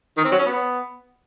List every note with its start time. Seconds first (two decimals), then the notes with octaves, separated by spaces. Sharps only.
0.17 D#3
0.25 C4
0.32 F#3
0.39 C#4
0.46 B3